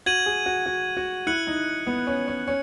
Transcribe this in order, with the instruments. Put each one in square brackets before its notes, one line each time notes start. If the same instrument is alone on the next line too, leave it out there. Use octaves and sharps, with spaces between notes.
[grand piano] F#4 [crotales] G#6 D#7 F#7
[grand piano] G#4
F#4
F#4
F#4
[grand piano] E4 [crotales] F#6 C#7 F#7
[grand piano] D#4
B3
C#4
C#4
[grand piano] C#4 [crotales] C#7